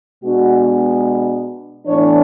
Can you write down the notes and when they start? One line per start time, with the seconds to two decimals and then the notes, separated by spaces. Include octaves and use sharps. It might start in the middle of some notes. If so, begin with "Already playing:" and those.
0.23 B2 G#3 B3 D4 F#4
1.87 A2 E3 B3 D4 C#5